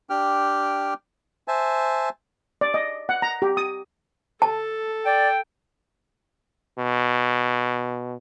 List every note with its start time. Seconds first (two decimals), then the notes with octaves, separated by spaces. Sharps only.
0.10 D4 G4 G5 F6
1.48 C5 E5 G#5 A5
2.61 D5
2.74 D#5
3.09 F#5
3.22 A#5
3.42 G4
3.57 D#6
4.42 A4 A5
5.05 D5 G5
6.78 B2